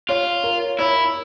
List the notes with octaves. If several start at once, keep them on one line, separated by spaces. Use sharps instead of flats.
F4 C#5
A#4
E4 C#5